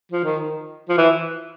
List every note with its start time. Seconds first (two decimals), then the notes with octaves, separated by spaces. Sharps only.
0.12 F3
0.24 D#3
0.89 F3
0.98 E3